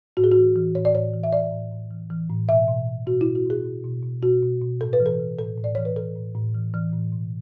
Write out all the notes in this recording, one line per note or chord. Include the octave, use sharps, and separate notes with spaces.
A2 F#4
G#4
E3 F#4
E3
A2 C#5
D5
A2 C#5
E3
E5
E3 D5
A2
A2
E3
E3
A2
B2 E5
B2
B2
B2 F#4
B2 E4
F#4
B2 G#4
B2
B2
B2
B2 F#4
B2
B2
A2 A4
B4
E3
A4
E3
A2 A4
A2
D5
E3 C#5
B4
E3 A4
A2
A2
E3
E3
A2
B2